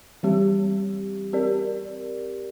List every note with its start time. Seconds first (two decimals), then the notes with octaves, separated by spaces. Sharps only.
0.23 E3 G3 C4 G4
1.33 C4 G4 A#4 D5